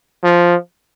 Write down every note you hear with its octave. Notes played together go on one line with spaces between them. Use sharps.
F3